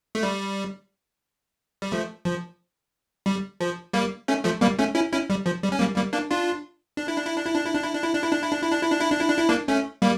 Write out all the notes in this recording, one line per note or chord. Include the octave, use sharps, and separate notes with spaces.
A3
G3
G3
F3 A3
F3
G3
F3
G3 A#3
A3 C#4
F3 A3
G3 A#3
A3 C#4
C#4 E4
C#4 E4
G3
F3
G3
C#4
G3 A#3
G3 A#3
A#3 D4
D4 F4
D4
E4
D4
E4
D4
E4
D4
E4
D4
E4
D4
E4
D4
E4
D4
E4
D4
E4
D4
E4
D4
E4
D4
E4
D4
E4
A#3 D4
A3 C#4
G3 A#3